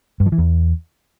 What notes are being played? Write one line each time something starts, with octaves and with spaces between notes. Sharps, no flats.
G2
F3
E3
E2